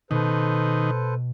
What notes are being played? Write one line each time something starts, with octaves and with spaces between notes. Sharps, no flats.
B2 D#3 A4 B4 C5